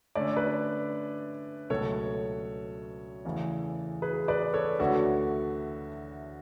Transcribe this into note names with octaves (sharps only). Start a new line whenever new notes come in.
D3 A3 C#4 D5
B4 D5
C#2 B2 F#3 A3 A4 C#5
E2 C#3 E3 A3
G#4 B4
B4 D5
A4 C#5
D2 D3 A3 D4 F#4 A4